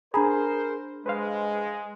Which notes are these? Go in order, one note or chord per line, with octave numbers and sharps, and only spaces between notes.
D4 G#4 A#4 C5 A#5 B5
G#3 B4 C5 F5